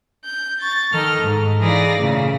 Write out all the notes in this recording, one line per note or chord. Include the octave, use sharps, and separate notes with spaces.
G6
C#6 A6
D#3 A4 D#5 F6
G#2
E3 D#4 G#4 D5 F5 A#6
A#2 C#3 A3